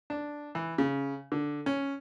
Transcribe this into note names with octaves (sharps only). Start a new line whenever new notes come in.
D4
E3
C#3
D3
C#4